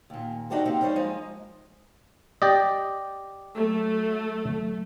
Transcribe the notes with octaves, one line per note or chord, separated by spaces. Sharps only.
D#2 A#2
D4 D#4 F#4 G4 A4 C5
A#3 C4 D#4 E4 G4
G3 C#4 D#4 C5 D5
F3 G#3 D#4
G4 D5 D#5
F#3 A3